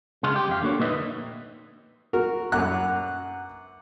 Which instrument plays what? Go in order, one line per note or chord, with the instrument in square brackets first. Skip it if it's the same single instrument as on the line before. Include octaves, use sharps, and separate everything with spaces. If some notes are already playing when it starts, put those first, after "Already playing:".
[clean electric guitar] C#3 G#3 F4
G4
F2 F5
D3 A#3 F#4 C#5
A#2 A#3 D#4 B4 D#5 E5
[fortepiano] F#4 A#4
[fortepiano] F#2 F#6 [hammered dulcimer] F#5 A#5 D6